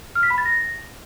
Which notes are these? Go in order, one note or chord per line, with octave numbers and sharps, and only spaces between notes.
F6
B6
B5
A6
A#6